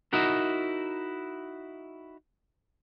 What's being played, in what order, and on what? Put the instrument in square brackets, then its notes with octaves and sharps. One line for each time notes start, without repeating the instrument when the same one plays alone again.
[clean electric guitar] D#4 E4 F#4 A#4